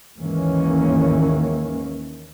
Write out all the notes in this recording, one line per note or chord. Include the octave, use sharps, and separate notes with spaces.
D#2 G#2 D#3 E3 A#3 C#4